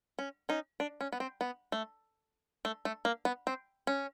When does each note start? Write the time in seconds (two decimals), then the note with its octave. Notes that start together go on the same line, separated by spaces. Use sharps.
0.19 C#4
0.49 C#4 D#4
0.80 D4
1.01 C#4
1.13 B3
1.20 C4
1.41 B3
1.72 A3
2.65 A3
2.85 A3
3.05 A#3
3.25 B3
3.47 C4
3.87 C#4